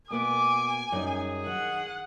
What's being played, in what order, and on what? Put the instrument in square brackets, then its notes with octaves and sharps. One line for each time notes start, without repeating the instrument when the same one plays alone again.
[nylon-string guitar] B2 A#3 B3 [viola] G#5 [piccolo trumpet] D6
[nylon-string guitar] F#2 G3 D#4 [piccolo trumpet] G#4
[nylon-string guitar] D#3 [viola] F#5